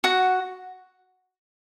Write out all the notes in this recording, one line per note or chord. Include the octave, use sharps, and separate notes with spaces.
F#4 F#5